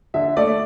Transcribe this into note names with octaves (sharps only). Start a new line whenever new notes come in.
D3 E5
A3 D5